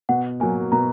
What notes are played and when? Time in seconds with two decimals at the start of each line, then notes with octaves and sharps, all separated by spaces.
0.09 B2 F#5
0.40 F#3 A#3 G#5
0.72 B2 A#5